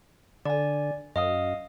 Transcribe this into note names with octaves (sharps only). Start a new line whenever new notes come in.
D3 D5 G#5
F#2 D#5 F5 D#6